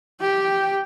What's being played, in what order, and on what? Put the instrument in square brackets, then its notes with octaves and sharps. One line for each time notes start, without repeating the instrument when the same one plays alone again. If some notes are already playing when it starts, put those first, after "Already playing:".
[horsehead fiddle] G4 G5